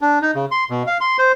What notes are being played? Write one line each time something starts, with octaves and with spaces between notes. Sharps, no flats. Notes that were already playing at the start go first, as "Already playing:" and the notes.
D4
D#4
C#3
C6
B2
F5
C6
C5